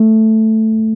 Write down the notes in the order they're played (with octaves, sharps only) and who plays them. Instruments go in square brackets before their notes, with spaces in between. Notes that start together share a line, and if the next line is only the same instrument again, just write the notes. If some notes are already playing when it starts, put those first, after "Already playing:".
Already playing: [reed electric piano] A3